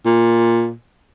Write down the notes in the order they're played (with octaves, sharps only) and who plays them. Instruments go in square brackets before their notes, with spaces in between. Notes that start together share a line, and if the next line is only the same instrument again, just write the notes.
[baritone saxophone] A#2